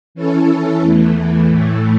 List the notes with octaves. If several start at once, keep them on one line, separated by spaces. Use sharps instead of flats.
E3 C#4 E4 A4
E2 E3 A3
A2 E3 A3